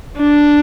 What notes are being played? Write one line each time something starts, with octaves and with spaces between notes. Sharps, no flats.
D4